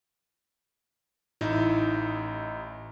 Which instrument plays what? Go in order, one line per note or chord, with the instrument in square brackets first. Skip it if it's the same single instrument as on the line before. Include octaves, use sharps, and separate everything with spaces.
[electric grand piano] A1 D#4 E4 [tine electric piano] A2